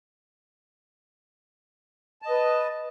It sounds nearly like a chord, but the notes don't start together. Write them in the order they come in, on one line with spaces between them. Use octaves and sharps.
A5 D#5 B4